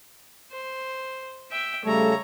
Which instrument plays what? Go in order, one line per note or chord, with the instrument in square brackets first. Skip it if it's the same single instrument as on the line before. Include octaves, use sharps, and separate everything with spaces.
[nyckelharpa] C5
E5 G5
[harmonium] C#3 G3 A4 [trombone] A3 [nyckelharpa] C#5 A#5